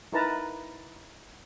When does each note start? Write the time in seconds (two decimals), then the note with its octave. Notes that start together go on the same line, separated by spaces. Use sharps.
0.12 D#4 E4 A#4 B4 A5 A#5